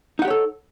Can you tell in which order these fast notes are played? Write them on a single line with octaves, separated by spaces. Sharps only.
D#4 F#5 G4 C#5 A4